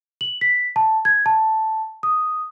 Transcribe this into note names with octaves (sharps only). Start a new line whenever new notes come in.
F#7
B6
A5
G#6
A5
D#6